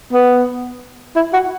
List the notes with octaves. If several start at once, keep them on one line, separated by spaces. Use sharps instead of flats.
B3
E4
F#4